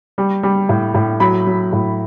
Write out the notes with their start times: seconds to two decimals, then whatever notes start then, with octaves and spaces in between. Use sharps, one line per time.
0.18 G3
0.43 G3
0.69 A2
0.94 A2
1.20 F#3 B5
1.47 F#3
1.73 A2